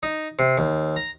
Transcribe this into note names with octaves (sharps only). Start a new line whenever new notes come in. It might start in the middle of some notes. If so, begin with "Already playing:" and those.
D#4
C3
D#2
A#5